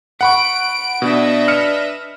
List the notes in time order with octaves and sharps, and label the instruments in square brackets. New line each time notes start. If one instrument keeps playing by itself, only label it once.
[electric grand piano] F#5 B5 C#6 [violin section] D7
[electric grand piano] B2 [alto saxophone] D4 [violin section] B4 D#5 E5
[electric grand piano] F6 C#7